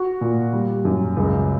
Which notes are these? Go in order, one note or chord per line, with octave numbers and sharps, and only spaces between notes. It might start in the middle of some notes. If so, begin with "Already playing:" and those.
Already playing: F#4
A#2
G3
F#2
C#2